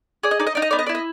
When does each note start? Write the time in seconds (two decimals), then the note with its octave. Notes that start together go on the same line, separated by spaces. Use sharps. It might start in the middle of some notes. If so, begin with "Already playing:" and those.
0.23 G#4 D5
0.31 D#5
0.40 D#4 D5
0.47 D#5
0.55 D#4 D5
0.62 D#5
0.71 B3 D5
0.79 D#5
0.86 D5
0.89 E4
0.95 D#5